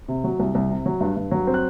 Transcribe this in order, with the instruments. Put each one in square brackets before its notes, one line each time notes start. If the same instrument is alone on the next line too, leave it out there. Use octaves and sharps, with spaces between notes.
[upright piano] C3
F#3
C2
C2
C3
F#3
G2
G2
F#3
C4
F#6